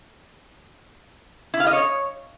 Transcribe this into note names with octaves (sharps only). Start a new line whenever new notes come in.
E4
F5
D#5
C#5